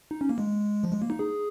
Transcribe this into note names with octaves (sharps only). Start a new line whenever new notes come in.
D#4
C#4
A#3
G#3
F3
G#3
A#3
D#4
G#4